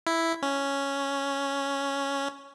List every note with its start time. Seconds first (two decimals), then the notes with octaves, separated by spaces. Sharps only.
0.07 E4
0.42 C#4